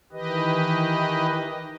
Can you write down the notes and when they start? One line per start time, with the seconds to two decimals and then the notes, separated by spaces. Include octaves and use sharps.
0.12 D#3 E3 G4 B4 D#5